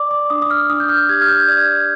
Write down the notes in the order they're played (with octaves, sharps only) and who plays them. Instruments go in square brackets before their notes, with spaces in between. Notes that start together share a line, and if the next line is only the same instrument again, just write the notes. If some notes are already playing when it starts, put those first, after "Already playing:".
Already playing: [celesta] D5 D6
D6
D4 D#6
D#6
F6
D4 D#6
G6
F6
G4 G#6
F6
G6
D5 G#6